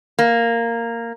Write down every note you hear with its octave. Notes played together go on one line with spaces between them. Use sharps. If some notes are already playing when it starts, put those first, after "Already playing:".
A#3